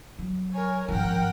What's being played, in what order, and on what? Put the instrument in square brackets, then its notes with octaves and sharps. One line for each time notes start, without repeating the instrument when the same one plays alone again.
[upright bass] F#3
[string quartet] A#4 C#5 G#5
[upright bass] G#1 F3 [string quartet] A#4 F#5 G5